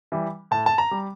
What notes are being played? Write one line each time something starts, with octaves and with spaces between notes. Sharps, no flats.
E3 G3
A2 A5
A5
A#5
G3